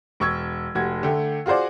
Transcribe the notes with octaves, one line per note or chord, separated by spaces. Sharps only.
E1 C#6 E6 G#6
F1 F#4 G#6
D3 A3 G5
F4 F#4 G#4 C5 D5